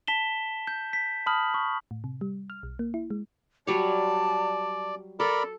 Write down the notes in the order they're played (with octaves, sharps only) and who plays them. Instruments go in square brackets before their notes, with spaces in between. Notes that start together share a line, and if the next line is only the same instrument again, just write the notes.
[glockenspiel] A5 B6 E7 G7
G6
B6
A5 B5 D#6 F6 F#7
C#6
[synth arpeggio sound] A2
C3
G3
F6
B1
A#3
E4
G#3
[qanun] F#3 G3 C#5 [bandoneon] D5 [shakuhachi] A5
[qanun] A4 [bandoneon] A#4 D5 B5